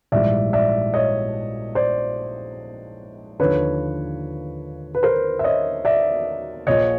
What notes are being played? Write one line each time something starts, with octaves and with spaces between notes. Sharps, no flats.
A#1 G#2 E3 G3 D5 E5
D5 E5
C#5 D#5
C5 D5
D#2 D3 F3 B4 C#5
B4
A#4 C5
E5
C#5 D#5
D5 E5
A#1 A#2 F3 C#5 D#5